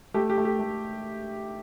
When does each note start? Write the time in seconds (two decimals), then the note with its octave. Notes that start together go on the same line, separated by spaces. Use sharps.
0.14 A3 G4
0.30 G4
0.38 A3
0.45 G4
0.60 A3